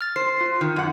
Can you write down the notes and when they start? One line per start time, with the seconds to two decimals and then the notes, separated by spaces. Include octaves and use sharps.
0.01 F6 A6
0.16 C5 C7
0.41 F4
0.61 D#3
0.76 F#2 F#5